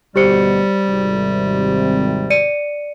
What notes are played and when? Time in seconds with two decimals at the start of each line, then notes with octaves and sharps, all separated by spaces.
0.16 D2 B2 G3 G4 C5 C#7
0.87 G#1 C3
2.30 D5 C#7 D#7